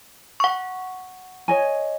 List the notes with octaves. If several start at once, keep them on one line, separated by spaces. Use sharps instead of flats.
F#5 C#6
C#5 D#5 G#5